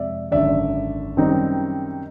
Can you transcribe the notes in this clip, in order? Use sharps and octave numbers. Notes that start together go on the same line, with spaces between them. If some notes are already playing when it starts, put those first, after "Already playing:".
Already playing: F2 C3 G#3 D5 E5
G#1 F#2 D3 D5 E5
F#2 D#3 G3 C4 D#4